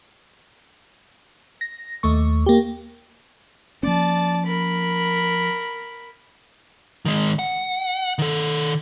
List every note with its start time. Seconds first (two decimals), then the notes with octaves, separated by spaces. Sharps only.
1.61 A#6
2.03 D#2 A3 C#6
2.46 A#3 G4
3.83 F3 A#3 C#4 D5 A5
4.46 A#4 B5
7.05 D#3 G#3
7.39 F#5
8.19 D#3 A4